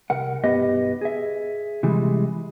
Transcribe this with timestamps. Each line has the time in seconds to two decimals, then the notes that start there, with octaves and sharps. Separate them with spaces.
0.10 C2 A#4 F#5
0.44 B1 G2 B3 G4 B4 D#5
1.01 G#4 E5
1.83 C3 E3 G3 G#3